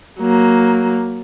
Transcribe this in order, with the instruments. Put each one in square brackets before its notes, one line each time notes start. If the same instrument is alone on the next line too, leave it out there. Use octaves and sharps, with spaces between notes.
[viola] F#3 A#3